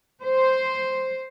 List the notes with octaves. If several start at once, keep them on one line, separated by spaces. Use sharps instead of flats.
C5